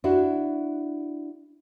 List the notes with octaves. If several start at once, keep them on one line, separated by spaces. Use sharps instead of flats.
D4 E4 F#4